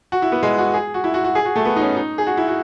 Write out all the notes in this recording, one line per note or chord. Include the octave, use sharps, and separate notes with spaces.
F#4
E4
B3
G#3
F#4
G#4
F#4
E4
F#4
F#4
G#4
F#4
A3
B3
D#4
C#4
D#4
G#4
F#4
E4
F#4